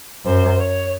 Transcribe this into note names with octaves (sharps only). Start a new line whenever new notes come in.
F#2 C5
C#5